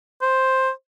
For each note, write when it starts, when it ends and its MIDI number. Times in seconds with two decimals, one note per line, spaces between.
0.21 0.70 72